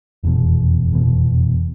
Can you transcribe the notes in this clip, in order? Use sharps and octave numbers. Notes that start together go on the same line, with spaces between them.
F1 E2 B2
F1 E2 B2